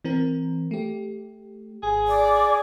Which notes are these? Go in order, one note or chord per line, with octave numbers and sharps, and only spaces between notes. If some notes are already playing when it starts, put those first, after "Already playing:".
E3 C4 A#4
A3 G4
G#1 G#4
D5